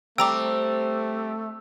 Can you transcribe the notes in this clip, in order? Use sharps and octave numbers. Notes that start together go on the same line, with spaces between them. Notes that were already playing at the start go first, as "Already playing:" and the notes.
G3 A3 C4 G5 A#5 D6 E6